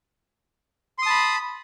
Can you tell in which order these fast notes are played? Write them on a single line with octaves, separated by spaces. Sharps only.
C6 D#6 A5 B5